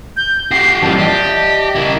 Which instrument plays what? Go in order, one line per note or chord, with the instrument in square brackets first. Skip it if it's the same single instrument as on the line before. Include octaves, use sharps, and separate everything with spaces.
[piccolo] G6
[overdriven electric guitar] F#4 G4 [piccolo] C7
[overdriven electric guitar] G2 F3 [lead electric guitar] A#2 E3 [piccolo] A5
[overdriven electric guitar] G4 [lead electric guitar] D5 D#5
[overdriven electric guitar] E4 A#4